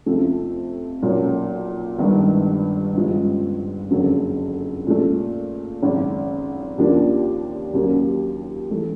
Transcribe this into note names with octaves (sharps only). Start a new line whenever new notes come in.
F2 C3 F3 A3
B1 A#2 F#3 A#3 C#4
G1 G2 D#3 G#3 B3
G1 F#2 C#3 F3 G#3
F#1 F2 D3 F#3 A#3
A#2 F3 A3
G#1 F#2 C#3
D#2 C#3 F3 A#3 D4
D#2 C#3 F#3 A#3
E3 A3